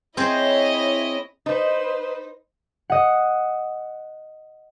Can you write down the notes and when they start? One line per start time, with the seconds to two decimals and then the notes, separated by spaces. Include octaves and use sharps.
0.17 C4 E4 G#4 C5 C#5 D#5
1.46 D#4 B4 C5
2.90 D#5 F#5